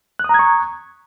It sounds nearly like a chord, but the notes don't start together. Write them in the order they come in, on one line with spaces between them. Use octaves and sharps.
F#6 D#6 A#5 G#6 C#6